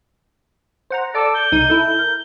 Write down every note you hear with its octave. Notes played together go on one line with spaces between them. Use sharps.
C5 F#5 A#5
A4 D5 D6 E6
G6
C2 D#4 D#7
E4 A4
A#4